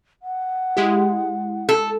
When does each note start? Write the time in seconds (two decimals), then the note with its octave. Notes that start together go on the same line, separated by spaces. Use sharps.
0.22 F#5
0.77 G#3 E4 G4
1.69 A4